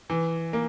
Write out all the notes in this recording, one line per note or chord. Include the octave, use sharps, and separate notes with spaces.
E3
A#3